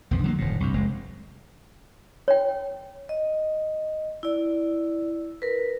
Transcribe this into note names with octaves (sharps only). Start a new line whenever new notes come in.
B1 F2 F3
D3 F#3 G3 A#3
D#1 F#2 A2
C2 G2
F1 G#3
C#5 G5
D#5
E4 D5
A#4 B4